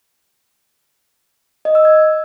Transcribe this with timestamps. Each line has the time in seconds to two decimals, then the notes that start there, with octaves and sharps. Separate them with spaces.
1.65 D#5
1.75 E6
1.85 G#6